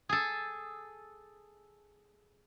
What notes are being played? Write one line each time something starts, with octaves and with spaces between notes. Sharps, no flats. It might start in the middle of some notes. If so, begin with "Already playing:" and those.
G#4 A4